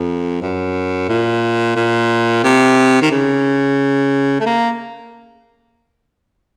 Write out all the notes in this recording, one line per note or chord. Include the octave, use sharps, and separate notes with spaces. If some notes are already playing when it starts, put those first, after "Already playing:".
Already playing: F2
F#2
A#2
A#2
C3
D#3
C#3
A3
A#3